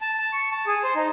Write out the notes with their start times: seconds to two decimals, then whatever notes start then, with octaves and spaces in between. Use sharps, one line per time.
0.01 A5
0.19 A5
0.33 C#6
0.52 A5
0.67 G#4
0.83 C5
0.96 D#4